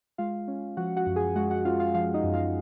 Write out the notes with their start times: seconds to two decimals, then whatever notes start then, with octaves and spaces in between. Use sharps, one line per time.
0.18 G#3 F4 F5
0.48 C#4
0.77 F3 F#4 F#5
0.97 F#4 F#5
1.06 F#2
1.16 G#4 G#5
1.36 G#3 F#4 F#5
1.51 F#4 F#5
1.65 C#4 F4 F5
1.80 F4 F5
1.95 F3 F4 F5
2.14 D#4 D#5
2.24 F#2
2.34 F4 F5